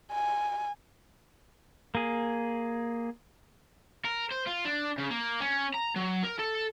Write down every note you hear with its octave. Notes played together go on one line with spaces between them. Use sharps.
G#5
A#3 G#4
A#4
C5
F4
D4
C#3
A#3
C#4
A#5
F#3
A#4
A4